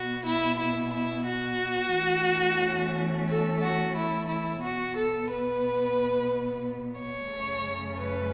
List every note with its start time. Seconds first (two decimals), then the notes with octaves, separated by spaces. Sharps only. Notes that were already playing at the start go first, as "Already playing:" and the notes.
Already playing: B2 B3 F#4
0.26 E4
0.58 E4
0.93 E4
1.26 F#4
1.94 E2 E3 A3 C#4
3.28 A4
3.62 F#4
3.96 E4
4.29 E4
4.63 B2 B3 F#4
4.97 A4
5.30 B4
6.99 C#5
7.33 F#2 C#3 A3 C#4
8.00 B4